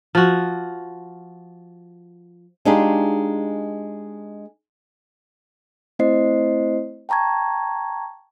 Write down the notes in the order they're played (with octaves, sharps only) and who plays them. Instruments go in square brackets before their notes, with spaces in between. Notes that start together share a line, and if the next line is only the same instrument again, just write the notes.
[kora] F3 F#4
[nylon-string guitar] G#3 D4 D#4 F4 G4 G#4
[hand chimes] A3 C4 E4 C5 D#5 C7
G5 A5 A#5 C#6 G#6